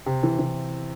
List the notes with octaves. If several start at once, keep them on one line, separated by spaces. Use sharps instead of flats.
C3
E3
E3